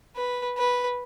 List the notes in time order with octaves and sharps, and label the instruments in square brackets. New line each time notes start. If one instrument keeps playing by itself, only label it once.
[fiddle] B4
B4